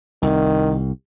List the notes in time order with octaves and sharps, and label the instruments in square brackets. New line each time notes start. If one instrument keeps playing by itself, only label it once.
[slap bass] C2 [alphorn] D#3